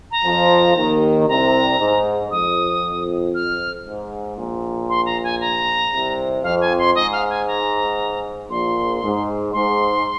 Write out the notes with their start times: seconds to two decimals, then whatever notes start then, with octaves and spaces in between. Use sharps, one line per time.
0.11 A#5
0.24 F2 F3
0.76 D#2 D#3
1.28 C2 C3 A#5
1.79 G#2
2.31 F2 D#6
3.35 F6
3.86 G#2
4.37 A#1 A#2
4.89 C6
5.06 A#5
5.24 G#5
5.41 A#5
5.92 C2 C3
6.43 F2 F5
6.61 G#5
6.79 C6
6.95 G#2 D#5
7.12 F5
7.30 G#5
7.47 A#5
8.50 A#1 A#2 C6
9.02 G#2
9.53 G#2 C6